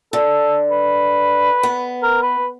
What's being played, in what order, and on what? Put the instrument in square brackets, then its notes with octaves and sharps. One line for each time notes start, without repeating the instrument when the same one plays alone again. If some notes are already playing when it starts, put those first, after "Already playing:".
[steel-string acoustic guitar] D3 [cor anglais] A4
[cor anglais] B4
[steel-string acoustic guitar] B3
[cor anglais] A#4
B4